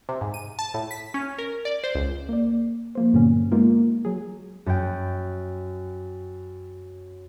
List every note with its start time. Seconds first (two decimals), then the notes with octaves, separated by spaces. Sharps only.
0.09 C3
0.21 G#2
0.34 D#7
0.59 A5
0.74 A2
0.91 B6
1.14 C#4
1.38 A#4
1.65 D5
1.84 C5
1.95 C#2
2.29 A#3 D5
2.95 F3 A#3 C5
3.13 G2 A#2 D3 F#3 B3 C#4
3.52 G#3 A#3 B3 D#4 F4 A#4
4.05 F#3 G#4
4.66 F#2 G5